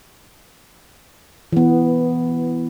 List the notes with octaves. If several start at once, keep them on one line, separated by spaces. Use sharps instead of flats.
E3 B3